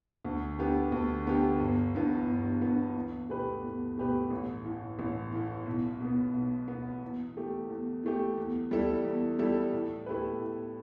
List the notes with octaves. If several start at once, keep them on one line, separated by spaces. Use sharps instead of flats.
D2
D3 B3 G4
D2
D3 B3 G4
G1
G2 E3 B3
G1
G2 E3 B3
E2
B2 A3 G4 B4
E2
B2 A3 G4 B4
A1
A2 E3
A1
A2 E3
B1
B2 B3
B1
B2 B3
E2
E3 A3 G4
E2
E3 A3 G4
E2
E3 G3 E4 A4
E2
E3 G3 E4 A4
A2
A3 E4 G4 B4
A2